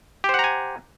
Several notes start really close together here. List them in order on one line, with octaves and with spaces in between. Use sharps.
G4 C5 F#5 A#5 G#5